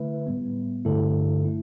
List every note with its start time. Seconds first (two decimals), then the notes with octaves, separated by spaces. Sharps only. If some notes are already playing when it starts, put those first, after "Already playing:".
Already playing: D3 A3 E4 B4 E5
0.27 A2 G3 B3
0.85 G2 D3 A3 E4 A4
1.45 A3 E4